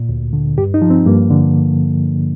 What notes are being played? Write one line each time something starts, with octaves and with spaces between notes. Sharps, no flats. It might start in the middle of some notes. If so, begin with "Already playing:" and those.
Already playing: A#2
D2
D3
G2 G4
D#4
F3
C4
G2 A#3
D3